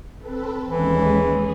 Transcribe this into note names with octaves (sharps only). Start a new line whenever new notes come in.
C4 A4 B4
D#2 E3 G#3 C#4
G#4